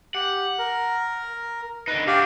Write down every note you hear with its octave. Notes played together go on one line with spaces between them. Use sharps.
G4 F#5
A#4
D3 D#4 B4
D4 F#4 G4 F5